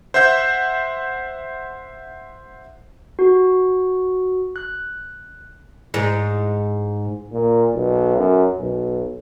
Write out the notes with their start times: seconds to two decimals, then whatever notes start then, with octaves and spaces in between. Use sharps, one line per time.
0.14 C5 E5 F#5 G6
3.19 F#4
4.56 F#6
5.94 G#2
7.32 A#2
7.74 B1
8.17 F#2
8.59 B1